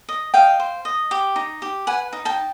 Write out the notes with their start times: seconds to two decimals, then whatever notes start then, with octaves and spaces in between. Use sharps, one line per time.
0.09 D#5
0.34 D#5 F5 G5
0.60 C5
0.85 D#5
1.11 G4
1.36 D#4
1.62 G4
1.87 B4 F#5 G#5
2.13 D#4
2.25 G5 A5